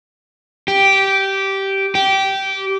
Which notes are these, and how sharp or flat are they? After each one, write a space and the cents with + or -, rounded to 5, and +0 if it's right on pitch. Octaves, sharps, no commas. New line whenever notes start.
G4 -10
G4 -15